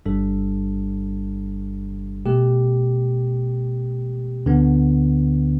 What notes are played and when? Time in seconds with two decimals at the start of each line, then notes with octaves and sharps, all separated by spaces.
0.06 G1 G2 G3 D4 A4
2.26 B2 A3 G4
4.46 D2 D3 B3